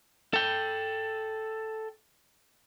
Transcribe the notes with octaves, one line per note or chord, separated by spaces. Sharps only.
A4 G5